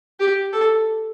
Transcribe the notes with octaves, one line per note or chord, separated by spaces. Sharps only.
G4
A4